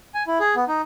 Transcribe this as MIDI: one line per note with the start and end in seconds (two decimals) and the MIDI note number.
0.14 0.23 80
0.27 0.39 64
0.40 0.54 68
0.55 0.64 59
0.68 0.81 63